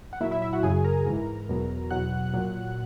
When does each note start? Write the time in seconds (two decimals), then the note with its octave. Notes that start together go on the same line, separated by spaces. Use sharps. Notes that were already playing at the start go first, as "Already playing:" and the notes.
0.13 F#5
0.20 A#2 F#3 E4 E5
0.31 E4 E5
0.42 E4 E5
0.53 F#4 F#5
0.63 F#2 C#3 F#3 G#4 G#5
0.84 A#4 A#5
1.06 G#2 E3
1.49 E2 B2 F#3
1.91 E2 B2 F#3 F#5 F#6
2.33 A#2 F#3